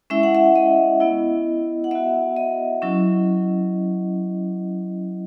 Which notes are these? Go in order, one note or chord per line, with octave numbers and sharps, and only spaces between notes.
G#3 C#4 E4 E5
F#5
E5
D#5
B3 E4
F#5
B3 F#4 E5
D#5
F#3 C#4 E4